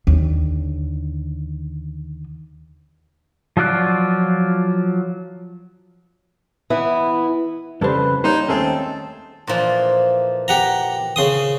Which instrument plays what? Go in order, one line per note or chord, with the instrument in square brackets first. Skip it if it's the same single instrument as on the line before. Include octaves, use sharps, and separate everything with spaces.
[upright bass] D#2 D3
[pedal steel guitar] F3 F#3 F4 D5 F#6
[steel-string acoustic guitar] E3 B3 E4 E5
[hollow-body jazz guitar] F2 C#3 A4 [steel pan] G3 C5 [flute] B4
[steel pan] G3 A#3 G5 [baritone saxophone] D#4 [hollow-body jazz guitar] C5 [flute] C#5
[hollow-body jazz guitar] D#2 A3 C#4 [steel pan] G#3 G#4 [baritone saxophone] C4 [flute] A5
[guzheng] A#2 E3 F3
[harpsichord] G4 F#5 A#5
C#3 C6 D#6